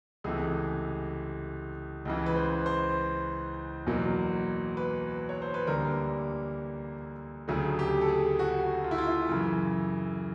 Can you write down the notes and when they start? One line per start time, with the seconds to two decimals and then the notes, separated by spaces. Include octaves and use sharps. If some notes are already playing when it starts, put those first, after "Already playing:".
0.24 C#2 C3 E3 A3 G#4
2.05 C#2 C#3 E3
2.26 B4
2.36 C5
2.66 C5
3.87 E2 B2 F#3 A#3
4.77 B4
5.29 C#5
5.42 C5
5.54 B4
5.67 D2 D3 G3 A#3 A#4
7.48 D2 C#3 F#3 A3 G#4
7.79 G4
8.01 A4
8.08 G#4
8.39 F#4
8.61 F#4
8.84 F4
8.91 E4
8.98 F4
9.07 E4
9.29 F#2 C#3 E3